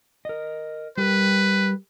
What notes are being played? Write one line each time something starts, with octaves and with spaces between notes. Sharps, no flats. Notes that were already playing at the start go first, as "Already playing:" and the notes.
A#4 D#5
G3 G4 A#4 B4